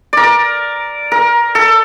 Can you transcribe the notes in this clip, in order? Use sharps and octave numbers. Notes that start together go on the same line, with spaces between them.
A#4 D5
A#4
A4